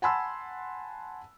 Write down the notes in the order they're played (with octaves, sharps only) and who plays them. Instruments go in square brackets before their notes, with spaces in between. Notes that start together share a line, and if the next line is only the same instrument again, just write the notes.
[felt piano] F#5 G#5 A5 B5 C6 E6